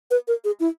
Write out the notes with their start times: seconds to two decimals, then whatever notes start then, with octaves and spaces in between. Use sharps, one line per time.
0.11 B4
0.28 A#4
0.44 G#4
0.60 E4